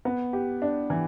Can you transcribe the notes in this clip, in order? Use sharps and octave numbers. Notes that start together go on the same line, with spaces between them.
B3
G4
D4
E3